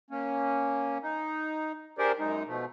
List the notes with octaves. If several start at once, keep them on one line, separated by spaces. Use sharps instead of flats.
A#3 C#4
D#4
D4 G4 G#4 A#4 C5 D5
F#2 G#3 D#4
B2 F3 A3